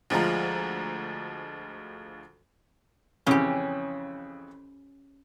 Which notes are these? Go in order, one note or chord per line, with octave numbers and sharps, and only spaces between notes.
D2 F3 G#3 F4 A#5
F2 C#3 E3 C#4 G4